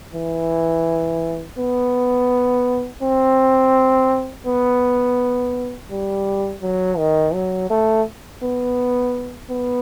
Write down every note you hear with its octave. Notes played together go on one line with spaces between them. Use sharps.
E3
B3
C4
B3
G3
F#3
D#3
F#3
A3
B3
B3